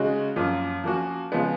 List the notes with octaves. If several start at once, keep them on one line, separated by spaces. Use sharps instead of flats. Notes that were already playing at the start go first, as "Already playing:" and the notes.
Already playing: C#3 G#3 D#4 F#4
F#2 F3 A#3 F4
F3 A#3 C#4 F#4
C#3 F3 G#3 B3